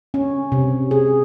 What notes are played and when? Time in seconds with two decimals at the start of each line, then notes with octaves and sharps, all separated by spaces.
0.14 C#4
0.52 C3
0.91 G#4